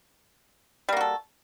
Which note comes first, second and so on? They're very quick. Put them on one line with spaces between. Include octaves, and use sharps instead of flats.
G3 A#3 F#4 A4